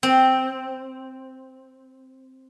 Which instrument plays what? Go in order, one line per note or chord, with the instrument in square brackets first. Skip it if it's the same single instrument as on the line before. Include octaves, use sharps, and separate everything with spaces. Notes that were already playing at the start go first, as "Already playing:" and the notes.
[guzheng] C4